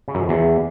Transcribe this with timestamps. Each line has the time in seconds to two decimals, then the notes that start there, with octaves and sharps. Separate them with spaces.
0.08 C#3
0.15 F#2
0.22 F2
0.29 E2